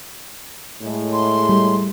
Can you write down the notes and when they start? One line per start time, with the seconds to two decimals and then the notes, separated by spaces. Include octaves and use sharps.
0.82 A2 G#3
1.13 C6
1.49 G3